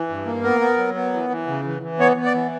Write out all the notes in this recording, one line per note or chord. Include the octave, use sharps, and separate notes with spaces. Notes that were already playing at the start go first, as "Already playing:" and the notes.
Already playing: E3
G2
A#3
B3 A#4
B3
F#3
B3
E3
E3
C#3
E3
E3
B3 C#5
B3
D5
E3